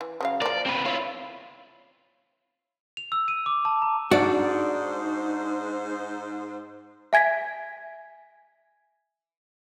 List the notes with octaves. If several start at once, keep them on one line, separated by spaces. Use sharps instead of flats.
E3
C#3 F#3 F5
F3 A#3 D5
C4 B4
E4 F4 C#5
F7
E6
D#7
D6
A5
A#5
G#2 D4 D#4 F#4 C5 D5
E5 G#5 G#6 A#6 B6